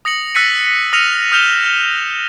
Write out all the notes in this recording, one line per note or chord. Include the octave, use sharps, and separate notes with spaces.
D#6 A#6 C#7 F#7
E6 F#6 A6 B6 C#7 D#7
B6
D#6 F6 A#6 C#7 D#7 F7
D#6 F6 G6 E7 F7 G7
F6